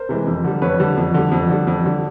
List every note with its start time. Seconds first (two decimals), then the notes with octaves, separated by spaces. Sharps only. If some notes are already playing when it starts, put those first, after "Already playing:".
Already playing: A#4 C5
0.09 C3 E3 G#3
0.27 F2
0.44 D3 G3
0.62 F2 B4 C#5
0.80 D3 G3
0.97 F2
1.14 D3 G3
1.32 F2
1.49 D3 G3
1.67 F2
1.85 D3 G3